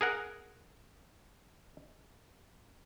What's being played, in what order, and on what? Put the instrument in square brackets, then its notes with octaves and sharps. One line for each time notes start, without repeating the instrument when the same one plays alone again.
[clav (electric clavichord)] G#4 A#4 F#5